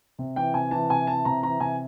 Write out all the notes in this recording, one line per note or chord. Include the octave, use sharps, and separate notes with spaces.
C3
E3 G5
C3 G#5
E3 A5
C3 G#5
E3 A5
C3 A#5
E3 A#5
C3 G#5